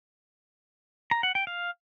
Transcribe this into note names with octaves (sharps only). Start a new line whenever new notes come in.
A#5
F#5
G5
F5